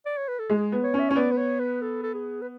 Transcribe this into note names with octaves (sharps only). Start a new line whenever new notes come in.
D5
C#5
B4
A4
G#3 G#4
B3
C#5
C#4
E5
C#4 C#5
B3 D5
B4
C#5
B4
A4
A4
G#4
B4